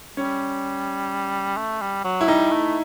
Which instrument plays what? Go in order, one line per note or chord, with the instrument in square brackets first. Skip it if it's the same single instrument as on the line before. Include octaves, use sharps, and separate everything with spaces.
[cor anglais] G3 [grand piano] C#4
[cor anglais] A3
G3
F#3
[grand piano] E4
[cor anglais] G3 [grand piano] D#4
[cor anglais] A3